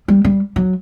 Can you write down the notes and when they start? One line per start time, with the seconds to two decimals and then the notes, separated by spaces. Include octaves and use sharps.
0.08 G3
0.25 G3
0.56 F#3